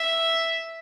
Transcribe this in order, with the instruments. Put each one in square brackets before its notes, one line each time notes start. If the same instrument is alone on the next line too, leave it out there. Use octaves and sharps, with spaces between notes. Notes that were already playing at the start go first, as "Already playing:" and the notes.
Already playing: [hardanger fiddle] E5